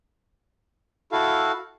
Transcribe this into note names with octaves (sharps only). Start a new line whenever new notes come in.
E4 F#4 A4 F5